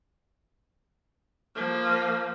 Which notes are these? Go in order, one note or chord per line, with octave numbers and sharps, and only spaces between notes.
F3 A#3